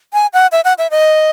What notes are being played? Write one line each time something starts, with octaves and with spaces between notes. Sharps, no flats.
G#5
F#5
E5
F#5
E5
D#5